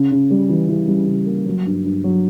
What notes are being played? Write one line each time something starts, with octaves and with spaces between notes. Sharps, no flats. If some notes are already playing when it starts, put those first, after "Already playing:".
Already playing: C#3
C#3
G3
E3
E3
G3
C#3
A#3
F#3
G2
G2
F#3